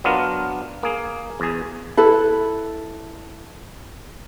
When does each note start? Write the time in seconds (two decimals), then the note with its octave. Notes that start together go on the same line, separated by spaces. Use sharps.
0.04 F#3 B3 D4 F4 A#4
0.83 A#3 G#4
1.40 E2 G#4
1.97 E4 A4 B4